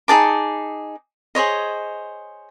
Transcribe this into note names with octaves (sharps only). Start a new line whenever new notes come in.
D#4 G#4 A5 D6
G#4 C5 C#5 D#5